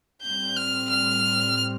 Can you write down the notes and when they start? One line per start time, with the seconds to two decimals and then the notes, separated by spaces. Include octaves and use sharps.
0.22 A2 G3 C4 G6
0.56 F6
0.90 F6